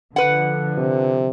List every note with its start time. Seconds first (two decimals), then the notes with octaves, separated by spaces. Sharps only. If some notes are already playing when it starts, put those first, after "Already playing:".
0.16 D3 F3 B4 F#5
0.78 C3